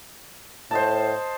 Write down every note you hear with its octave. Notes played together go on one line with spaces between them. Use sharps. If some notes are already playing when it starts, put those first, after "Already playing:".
A2 C5 D#5 A5